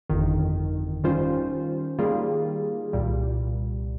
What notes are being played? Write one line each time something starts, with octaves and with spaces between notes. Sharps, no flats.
G1 F2 D#3
D#3 G3 C#4 F4 C5
D#3 G3 A#3 F4 G#4
C2 A#2 G3